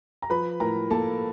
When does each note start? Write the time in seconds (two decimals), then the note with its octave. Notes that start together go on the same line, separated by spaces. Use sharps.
0.22 A#5
0.30 F3 B4 B5
0.60 A2 A#4 A#5
0.90 A#3 A4 A5